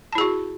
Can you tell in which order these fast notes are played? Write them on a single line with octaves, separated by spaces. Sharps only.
A5 E4 G#4 F#4